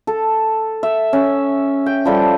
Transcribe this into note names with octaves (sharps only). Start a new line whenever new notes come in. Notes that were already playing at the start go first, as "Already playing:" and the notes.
A4
E5
C#4
G5
F3 G3 A4